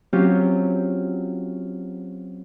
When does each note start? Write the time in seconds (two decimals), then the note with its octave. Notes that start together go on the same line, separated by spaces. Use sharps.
0.13 F#3 C4 C#4 F4 G4